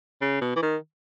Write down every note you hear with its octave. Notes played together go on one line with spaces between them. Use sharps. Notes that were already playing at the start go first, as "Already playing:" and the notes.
C#3
B2
E3
D#3